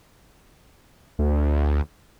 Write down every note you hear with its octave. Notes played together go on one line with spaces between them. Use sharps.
D2